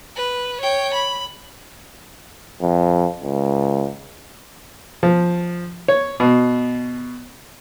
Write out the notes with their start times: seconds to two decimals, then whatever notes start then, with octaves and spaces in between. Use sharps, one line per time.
0.16 B4
0.61 C#5 G5
0.94 B5
2.61 F2
3.23 C#2
5.03 F3
5.88 C#5
6.20 B2